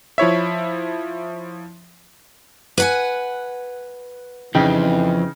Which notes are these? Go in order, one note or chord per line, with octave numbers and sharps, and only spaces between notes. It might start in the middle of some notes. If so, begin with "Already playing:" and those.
F3 E4 C#5 E5
B4 F#5 G#5
F2 C#3 E3 D#4 G5